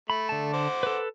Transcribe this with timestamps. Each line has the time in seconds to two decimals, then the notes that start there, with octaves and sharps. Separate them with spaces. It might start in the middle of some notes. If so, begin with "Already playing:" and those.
0.10 A3 B5
0.29 D3 A5
0.53 C5 F#5 D6
0.83 A4 B4